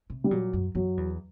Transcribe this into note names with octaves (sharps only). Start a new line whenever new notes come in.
C3
G3
A#2 F#3
F#2
F#2 F#3
E2